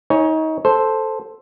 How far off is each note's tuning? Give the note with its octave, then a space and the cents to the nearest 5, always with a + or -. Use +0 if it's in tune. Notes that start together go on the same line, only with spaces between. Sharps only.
D#4 +30 C#5 +0 G#5 +0
A4 +0 C5 +0